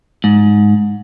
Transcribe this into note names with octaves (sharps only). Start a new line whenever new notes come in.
G#2